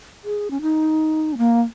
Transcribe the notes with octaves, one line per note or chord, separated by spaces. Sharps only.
G#4
C#4
D#4
C#4
A#3